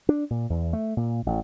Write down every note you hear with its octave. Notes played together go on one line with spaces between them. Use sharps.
D4
A#2
E2
A3
A#2
A1